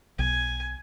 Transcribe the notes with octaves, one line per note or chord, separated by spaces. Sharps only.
B1 G#5